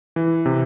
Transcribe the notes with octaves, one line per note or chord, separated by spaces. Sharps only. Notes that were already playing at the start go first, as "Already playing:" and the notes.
E3
C3